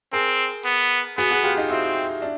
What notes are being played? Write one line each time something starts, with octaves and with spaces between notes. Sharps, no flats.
C4 G#4 A#4
B3
B3 F#4 G#4
F#4 G#4
F4 G4
D#4 F4
C4 E4 F#4
D4 E4